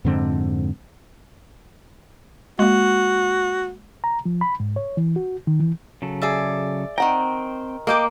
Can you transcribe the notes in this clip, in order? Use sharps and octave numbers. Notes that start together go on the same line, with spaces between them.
F2 G#2 D3 C4
G#3 A#3 F#4
A#5
F3
B5
G#2
C#5
E3
F#4
D#3
E3
C#3 F#3 A4
G#4 D5 E5
D#3 C4 F#5 G5 A#5
A#3 D#5 G5 D6